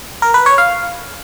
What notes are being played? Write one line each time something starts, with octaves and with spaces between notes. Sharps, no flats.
A#4
B4
C#5
F5